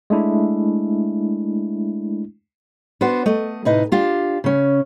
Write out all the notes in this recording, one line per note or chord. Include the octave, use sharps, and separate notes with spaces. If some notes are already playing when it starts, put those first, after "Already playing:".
G#3 A3 D4 E4
B3 D4 F#4 C5
A3 D#5
A2 C3 D#4 B4 D#5
D4 F4 G4
C#3 C#4